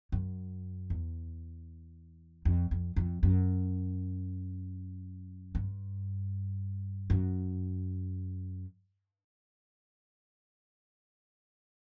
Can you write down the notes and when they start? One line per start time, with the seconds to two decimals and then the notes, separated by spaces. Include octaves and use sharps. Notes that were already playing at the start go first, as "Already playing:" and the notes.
0.12 F#2
0.90 E2
2.45 F2
2.71 F2
2.96 F2
3.23 F#2
5.55 G2
7.10 F#2